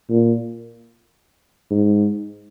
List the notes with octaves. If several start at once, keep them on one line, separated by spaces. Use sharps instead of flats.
A#2
G#2